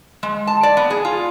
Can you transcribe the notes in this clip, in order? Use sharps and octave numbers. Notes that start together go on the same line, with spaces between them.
G#3
A5
D5
B3
G#4
F4